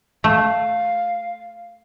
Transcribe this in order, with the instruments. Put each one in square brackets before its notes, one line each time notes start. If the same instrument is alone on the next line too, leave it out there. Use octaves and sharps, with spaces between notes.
[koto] A3 [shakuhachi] F5